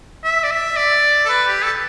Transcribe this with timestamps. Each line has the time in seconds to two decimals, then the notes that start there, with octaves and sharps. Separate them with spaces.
0.24 E5
0.44 D5
0.51 E5
0.77 D5
1.26 A4
1.29 B4
1.47 G4
1.64 A4